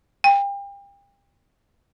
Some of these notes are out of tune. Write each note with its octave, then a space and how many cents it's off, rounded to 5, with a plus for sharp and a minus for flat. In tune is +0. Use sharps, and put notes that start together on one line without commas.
G5 +35